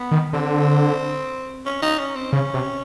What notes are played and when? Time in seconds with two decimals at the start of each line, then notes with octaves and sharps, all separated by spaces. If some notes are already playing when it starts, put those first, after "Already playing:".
Already playing: B3
0.11 D#3
0.33 D3 C4
1.66 C#4
1.82 D#4
1.99 C#4
2.16 C4
2.32 C#3 C#4
2.54 C3